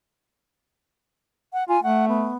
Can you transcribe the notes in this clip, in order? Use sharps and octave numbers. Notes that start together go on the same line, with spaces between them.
F#5
F4 G#5
A3 F#5
B3